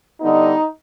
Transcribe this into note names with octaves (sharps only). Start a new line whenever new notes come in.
D3 G3 B3 D#4